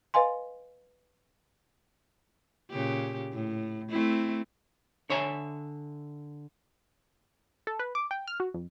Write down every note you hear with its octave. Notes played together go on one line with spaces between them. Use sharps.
B4 D#5 F5 G#5 C6
A#2 C#3 G4
A2
A3 C4 E4
D3 C#5 E5 G#5
A4
B4
D6
G5
F6
F#4
F2